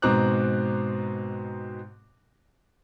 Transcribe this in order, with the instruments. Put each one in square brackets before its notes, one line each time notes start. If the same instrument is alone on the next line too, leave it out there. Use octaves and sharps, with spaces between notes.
[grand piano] G#2 B2 C4 A#5 D6 F#6